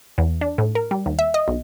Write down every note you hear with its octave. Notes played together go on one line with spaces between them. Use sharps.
E2
D4
A2
A#4
G3
D#2
E5
D#5
B1